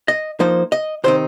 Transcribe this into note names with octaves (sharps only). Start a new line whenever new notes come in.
D#5
F3 A#3 D#4 C5
D#5
C3 D#3 C4 D#4 C5